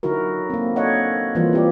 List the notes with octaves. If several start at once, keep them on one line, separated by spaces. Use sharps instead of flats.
D3 F#3 D#4 E4 F#4 A#4
A#3 C4
D4 A4 C#5 D#5 F#5
E3 F3 G3 A#3 F4
C4 G4 D5